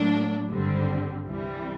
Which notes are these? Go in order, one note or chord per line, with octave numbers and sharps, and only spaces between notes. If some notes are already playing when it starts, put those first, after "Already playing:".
Already playing: A2 F#3 A#3 D4
G#1 G2 D3 G3 C4
C2 C3 E3 G3